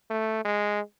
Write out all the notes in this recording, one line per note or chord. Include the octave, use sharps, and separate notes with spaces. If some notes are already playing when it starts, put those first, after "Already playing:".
A3
G#3